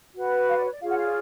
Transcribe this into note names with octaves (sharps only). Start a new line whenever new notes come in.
F#4 B4
F5
D5
C#5
D5
F4 G#4 C#5 F5
F#5
F5
D5